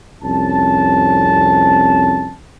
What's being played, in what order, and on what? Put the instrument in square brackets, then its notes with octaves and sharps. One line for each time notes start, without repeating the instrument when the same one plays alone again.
[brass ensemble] C2 F2 C#4 A5